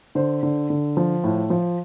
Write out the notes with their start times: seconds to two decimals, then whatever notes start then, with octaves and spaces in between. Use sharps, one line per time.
0.15 D3 C5
0.43 D3
0.70 D3
0.97 F3
1.24 A2
1.50 F3